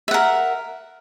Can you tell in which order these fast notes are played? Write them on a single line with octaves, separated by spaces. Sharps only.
E5 F#5 A#4